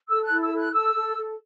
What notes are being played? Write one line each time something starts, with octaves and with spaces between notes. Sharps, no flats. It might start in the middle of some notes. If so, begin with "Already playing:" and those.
A4 E6
F#6
E4
E6
A4
F#6
A4 E6
A4
A4